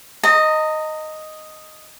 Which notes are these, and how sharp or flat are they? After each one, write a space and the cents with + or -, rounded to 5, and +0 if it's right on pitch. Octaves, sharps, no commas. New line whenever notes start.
D#5 +0 A#5 -35